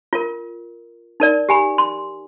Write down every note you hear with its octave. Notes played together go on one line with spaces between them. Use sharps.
F4 A#4
D#4 A#4 D5
G4 G#5 B5
C6